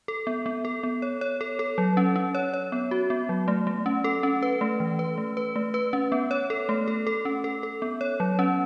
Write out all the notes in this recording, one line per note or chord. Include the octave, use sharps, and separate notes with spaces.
A4
B3
B3
A4
B3
C#5
C#5
A4
A4
F#3
C#4
C#4
C#5
C#5
B3
F#4
B3
F#3
A3
A3
C#4
A4
C#4
B4
A3
E3
B4
A3
B4
A3
B4
C#4
B3
C#5
A4
A3
A4
A4
C#4
A4
A4
B3
C#5
F#3
C#4